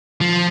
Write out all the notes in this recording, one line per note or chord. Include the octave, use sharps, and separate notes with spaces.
F3